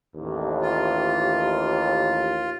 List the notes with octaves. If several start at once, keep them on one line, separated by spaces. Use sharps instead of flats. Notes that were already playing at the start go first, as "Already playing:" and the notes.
A1 D#2
F4